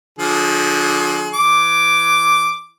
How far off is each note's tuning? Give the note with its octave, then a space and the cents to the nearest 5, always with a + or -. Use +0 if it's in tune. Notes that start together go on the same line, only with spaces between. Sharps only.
D3 +0 F3 +35 G#4 +35
E3 +20 D6 +0